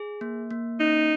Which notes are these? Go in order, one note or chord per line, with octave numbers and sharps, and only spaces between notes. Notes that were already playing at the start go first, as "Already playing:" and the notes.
Already playing: G#4
A#3
A#3
C#4 D#4